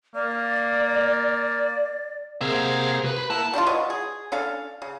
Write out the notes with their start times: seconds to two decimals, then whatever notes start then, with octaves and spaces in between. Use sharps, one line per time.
0.15 A#3 D5
2.41 C3 A#3 G#4 E5 F5
3.06 B4
3.30 A#3 E4 F#5 A5
3.53 G3 D4 E4 F4
3.66 F#3 B4 C#5 D#5
3.90 G#4
4.32 C#4 D4 A4 F5
4.82 C#3